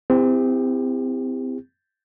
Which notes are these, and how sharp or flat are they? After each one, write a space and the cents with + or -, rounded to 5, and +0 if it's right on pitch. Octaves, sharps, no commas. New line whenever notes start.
C4 -25 E4 +0 G4 +35